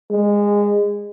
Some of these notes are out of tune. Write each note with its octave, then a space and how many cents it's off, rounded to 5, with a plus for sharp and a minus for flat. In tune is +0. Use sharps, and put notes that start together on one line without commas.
G#3 -20